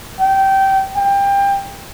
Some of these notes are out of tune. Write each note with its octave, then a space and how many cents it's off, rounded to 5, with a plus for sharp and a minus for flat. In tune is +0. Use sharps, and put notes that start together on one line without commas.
G5 -20
G5 +25